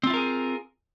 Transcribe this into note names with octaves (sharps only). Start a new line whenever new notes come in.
C4 E4 F4 G#4 A#4